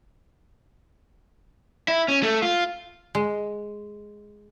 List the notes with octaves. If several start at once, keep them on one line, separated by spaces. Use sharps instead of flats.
E4
C#4
A3
F4
G#3